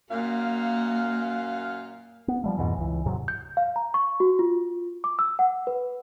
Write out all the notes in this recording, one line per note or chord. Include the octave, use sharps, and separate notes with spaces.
F#2 A#2 A#3 F5
B3
F3 G3 A3
F2 G#2 B2 E3
C#2 E3
D#2 G#2 C3 F#3
G6
F5
A#5
C#6
F#4
F4
D6
E6
F#5
B4